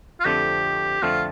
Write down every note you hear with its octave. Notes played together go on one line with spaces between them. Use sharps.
F4
F2 D3 A3 C4 G4
F2 D3 A3 C4 F4